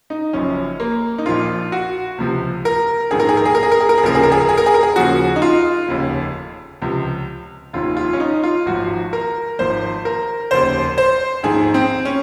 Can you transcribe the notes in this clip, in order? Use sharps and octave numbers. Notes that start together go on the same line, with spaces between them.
D#4
F#1 F#2 F3 C#4
A#3
D#4
A#1 A#2 F3 F4
F#4
C#2 C3 F3
A#4
A#1 G#2 D#3 G#4
A#4
G#4
A#4
G#4
A#4
G#4
A#4
G#4
A#4
G#4
F1 D#2 C#3 F3 A#4
G#4
A#4
G#4
A#4
G#4
A#4
G#4
A#4
G#4
D#2 C#3 F3 F#4
D#4
F4
F1 D#2 C#3
C#2 C3 F3
F1 D#2 D#3 F4
F4
C#4
D#4
F4
G#1 G#2 F3 F#4
A#4
G#1 G#2 F3 C5
A#4
F1 D#2 C#3 C5
C5
A#1 G#2 D#3 G#4
C4
C#4